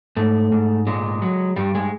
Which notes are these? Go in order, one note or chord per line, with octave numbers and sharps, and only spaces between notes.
G#2 A3
G#2
A#2 G#3
F#3
G2 G3
G#3